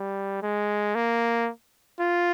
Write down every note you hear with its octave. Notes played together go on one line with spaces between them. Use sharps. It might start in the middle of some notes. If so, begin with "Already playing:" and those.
Already playing: G3
G#3
A#3
F4